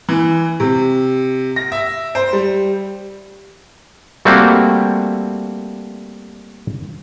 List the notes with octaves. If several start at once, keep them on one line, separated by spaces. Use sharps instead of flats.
E3
C3
A#6
E5
C5
G3
G3 A3 A#3 C4 F#4